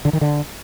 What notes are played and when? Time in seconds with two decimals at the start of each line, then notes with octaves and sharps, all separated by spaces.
0.05 D3
0.13 D#3
0.21 D3